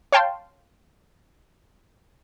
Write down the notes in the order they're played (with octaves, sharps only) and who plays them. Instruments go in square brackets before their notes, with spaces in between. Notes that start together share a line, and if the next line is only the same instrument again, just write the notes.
[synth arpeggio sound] C#5 F5 G5 A5 C6